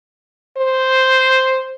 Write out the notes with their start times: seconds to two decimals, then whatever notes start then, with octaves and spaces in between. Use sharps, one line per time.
0.57 C5